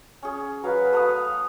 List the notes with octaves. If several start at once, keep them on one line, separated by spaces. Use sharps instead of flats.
C#4 G#4
F#3 B4 F5
A3 F5 D#6